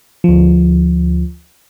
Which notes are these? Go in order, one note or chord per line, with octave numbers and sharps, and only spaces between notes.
D2 F3